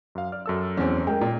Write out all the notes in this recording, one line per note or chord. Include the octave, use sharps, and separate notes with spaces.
F#2 F5
D5 F6
F#2 A4 E6
E2 C4 C#4
G#3 A#4 G5
A#2